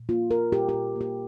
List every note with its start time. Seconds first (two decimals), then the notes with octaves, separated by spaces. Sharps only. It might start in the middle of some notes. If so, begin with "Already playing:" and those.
Already playing: A#2
0.09 A#3 F4
0.31 A#3 A#4
0.52 A#2 G4
0.69 A#2 G4
0.96 A#3 G4